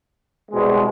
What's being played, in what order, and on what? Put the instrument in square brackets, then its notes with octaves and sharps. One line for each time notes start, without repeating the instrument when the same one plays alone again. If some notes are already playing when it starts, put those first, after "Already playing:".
[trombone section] C2 B2 G#3